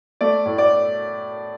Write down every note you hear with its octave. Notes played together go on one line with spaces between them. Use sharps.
A3 D5
A2
D5